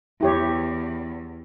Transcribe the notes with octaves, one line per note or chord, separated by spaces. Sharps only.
E2 E4 G4 C#5